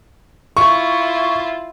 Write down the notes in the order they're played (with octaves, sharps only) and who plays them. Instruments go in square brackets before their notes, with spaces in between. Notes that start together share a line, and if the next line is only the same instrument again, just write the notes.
[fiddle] E4 F4 [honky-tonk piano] C#6